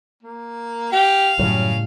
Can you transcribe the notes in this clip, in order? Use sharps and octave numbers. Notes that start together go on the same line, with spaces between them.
A#3
G4 F5
F#2 A2 C#3 G3